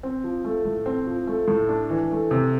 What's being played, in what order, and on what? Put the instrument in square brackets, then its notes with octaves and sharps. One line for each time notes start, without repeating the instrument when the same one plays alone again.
[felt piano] C4
F3
A3
A2
C4
F3
A3
A2
D4
E3
A3
C3